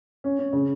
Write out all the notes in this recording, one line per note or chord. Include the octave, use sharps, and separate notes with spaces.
C#4
C#4
C#3